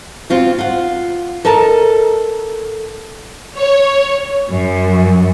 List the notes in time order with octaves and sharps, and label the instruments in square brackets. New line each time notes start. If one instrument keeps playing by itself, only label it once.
[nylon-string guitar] C4 F4 F#4
F4 F#5
A4 A#4 D#5 A5
[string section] C#5
F#2